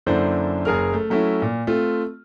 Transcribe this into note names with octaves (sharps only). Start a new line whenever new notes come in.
F#2 D3 A#3 D4 E4 C5
F#1 G#4 A#4 F6
A3
F#3 A3 C#4 E4
A#2
A3 C4 F4